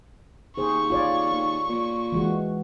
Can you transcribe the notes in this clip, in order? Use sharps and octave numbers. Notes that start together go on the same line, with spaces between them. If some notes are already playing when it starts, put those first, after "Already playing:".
D#2 G#4 C5 C#6
F4 C#5 D5
D#2
A#2
E3 G#3 F#4